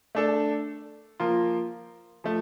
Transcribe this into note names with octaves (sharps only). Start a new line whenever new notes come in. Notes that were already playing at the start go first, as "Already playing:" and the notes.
A3 D4 A4
F3 A#3 F4 A#4
F3 A3